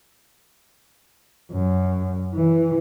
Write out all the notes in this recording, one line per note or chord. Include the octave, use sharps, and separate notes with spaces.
F#2
E3